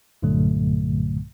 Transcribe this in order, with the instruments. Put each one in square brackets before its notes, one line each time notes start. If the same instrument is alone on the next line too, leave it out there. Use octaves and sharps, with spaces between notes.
[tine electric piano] B1 G2 A#2 D3 F#3 A3